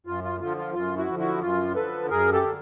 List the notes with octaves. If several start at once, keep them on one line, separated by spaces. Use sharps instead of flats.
F#2 F4
F4
D3 F3 F4
F4
F#2 F4
E4 F#4
D3 F3
E4 F#4
F#2 F4
D3 F3 A4 B4
F#2 G#4 A#4
G4 A4
D3